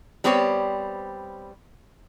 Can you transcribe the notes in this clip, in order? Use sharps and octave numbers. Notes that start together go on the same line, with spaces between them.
G3 B3 C4 G4 C5 C#5